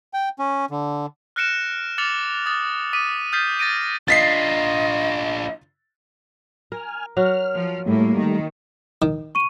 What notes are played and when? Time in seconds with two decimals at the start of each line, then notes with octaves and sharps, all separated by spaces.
0.14 G5
0.39 C#4
0.71 D3
1.36 F6 F#6 A#6 C#7 D7 E7
1.98 D6 F6 A6 C#7 F7 F#7
2.46 D#6 A6
2.93 D6 D#6 B6 D#7
3.32 D#6 F6 G6 A6 B6 C7
3.59 A6 A#6 D7 D#7
4.08 D4 F4 D#5 A6 B6 C7
6.72 A#4 G#5 F6
7.17 F#3 F#4 F6
7.55 F3
7.86 A2 G3 A3 A#3
8.17 D#3
9.02 D#3
9.35 C#6 D#7